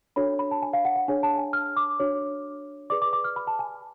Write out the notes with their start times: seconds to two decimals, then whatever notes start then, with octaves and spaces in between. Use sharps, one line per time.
0.16 D4 F#4 A4 C#5 B5
0.39 B5
0.51 A5
0.62 G#5
0.73 F5
0.85 F#5
0.96 F#5
1.08 D4 G#4 C#5 G#5
1.23 A5
1.38 G#5
1.53 F6
1.77 D6
1.99 D4 F#4 C#5
2.90 G#4 B4 D5 D6
3.02 D6
3.13 D6
3.24 F6
3.36 B5
3.47 A5
3.59 G#5